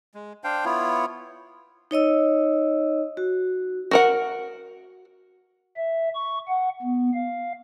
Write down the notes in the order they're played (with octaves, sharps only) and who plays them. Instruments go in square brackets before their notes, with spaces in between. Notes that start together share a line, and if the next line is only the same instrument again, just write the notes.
[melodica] G#3
D4 C5 F5 G5
B3 E4 F4 C#5
[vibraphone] D#4 C#5 D#5 E6
F#4
[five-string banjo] F#4 A#4 F#5
[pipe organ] E5
C#6
F#5
B3
F5